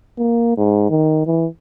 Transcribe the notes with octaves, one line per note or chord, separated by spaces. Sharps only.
A#3
G#2
D#3
E3